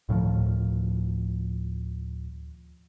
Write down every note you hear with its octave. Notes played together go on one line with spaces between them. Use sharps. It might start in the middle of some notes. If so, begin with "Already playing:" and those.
D2 A2 D#3 F3